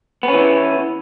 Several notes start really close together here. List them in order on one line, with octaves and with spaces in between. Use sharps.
B3 C#4 E3